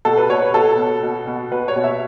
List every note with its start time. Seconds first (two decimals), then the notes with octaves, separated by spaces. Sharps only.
0.05 B2 A4
0.17 B4
0.29 B2 C#5
0.42 B4
0.54 B2 A4
0.78 B2
1.03 B2
1.27 B2
1.51 B2 B4
1.68 C#5
1.76 B2
1.84 E5